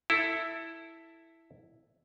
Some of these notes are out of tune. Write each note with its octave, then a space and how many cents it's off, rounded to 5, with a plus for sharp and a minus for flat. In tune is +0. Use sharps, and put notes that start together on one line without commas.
E4 +0 A4 +10